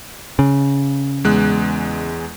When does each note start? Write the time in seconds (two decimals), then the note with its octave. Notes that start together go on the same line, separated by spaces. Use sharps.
0.39 C#3
1.24 E2 G#3 F#6